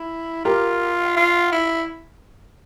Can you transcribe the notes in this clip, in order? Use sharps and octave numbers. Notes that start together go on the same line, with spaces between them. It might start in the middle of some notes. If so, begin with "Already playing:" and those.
Already playing: E4
F4 G4 A#4
F4
E4